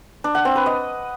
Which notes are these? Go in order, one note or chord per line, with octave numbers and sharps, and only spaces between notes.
D4
F#5
C4
B4
D#5